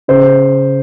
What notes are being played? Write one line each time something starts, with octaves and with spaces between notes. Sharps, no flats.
C#3 C5